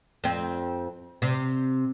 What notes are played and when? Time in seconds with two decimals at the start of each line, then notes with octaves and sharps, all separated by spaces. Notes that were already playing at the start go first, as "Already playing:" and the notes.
0.24 F2 C4
1.22 C3